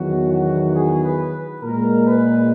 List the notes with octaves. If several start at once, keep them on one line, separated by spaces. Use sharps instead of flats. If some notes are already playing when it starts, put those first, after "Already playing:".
Already playing: E2 D#3 F#3 F#4
F#4
G#4
B4
A#2 G#3 A#4
B4